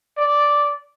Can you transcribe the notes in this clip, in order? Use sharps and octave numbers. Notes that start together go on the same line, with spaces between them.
D5